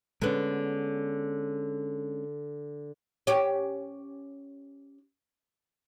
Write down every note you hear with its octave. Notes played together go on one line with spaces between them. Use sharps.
D3 G#3 B3 C#4
C#4 G4